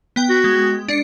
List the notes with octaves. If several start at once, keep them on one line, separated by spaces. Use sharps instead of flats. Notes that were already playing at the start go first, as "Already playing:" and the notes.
B3 G5
F#4
G#3
D4 C7 C#7